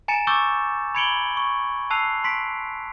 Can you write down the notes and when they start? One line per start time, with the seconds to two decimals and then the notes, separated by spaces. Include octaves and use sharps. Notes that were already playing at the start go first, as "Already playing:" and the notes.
0.08 G#5 A#5 A6 C#7 E7
0.27 C#6 D6 E6 G6 A6
0.95 B5 G#6 C#7 D7 F#7 G7
1.37 C#6
1.91 A5 E6 F#6 C7 F7
2.24 C6 B6 D7